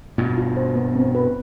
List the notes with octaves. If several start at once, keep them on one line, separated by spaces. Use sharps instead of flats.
G2 B2 F4
F4
C5
B3
C4
B4